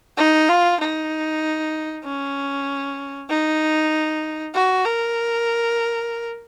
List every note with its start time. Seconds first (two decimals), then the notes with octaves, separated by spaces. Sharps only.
0.18 D#4
0.49 F4
0.81 D#4
2.05 C#4
3.29 D#4
4.54 F#4
4.85 A#4